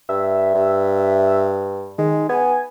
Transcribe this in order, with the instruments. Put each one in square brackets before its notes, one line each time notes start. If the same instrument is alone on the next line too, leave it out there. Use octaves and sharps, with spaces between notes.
[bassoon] G2 [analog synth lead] E5
[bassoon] G2
[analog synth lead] D#3 [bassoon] G#3
[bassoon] B3 [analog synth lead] G#5